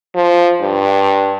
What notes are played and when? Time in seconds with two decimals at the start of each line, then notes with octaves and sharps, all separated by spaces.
0.15 F3
0.61 G2